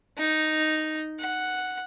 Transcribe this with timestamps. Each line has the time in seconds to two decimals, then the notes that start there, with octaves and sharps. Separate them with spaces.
0.18 D#4
1.19 F#5